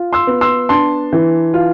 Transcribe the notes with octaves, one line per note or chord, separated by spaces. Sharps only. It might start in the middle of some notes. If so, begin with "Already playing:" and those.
Already playing: F4
C6 E6
B3
C6 E6
D4 A5 C6
E3
F4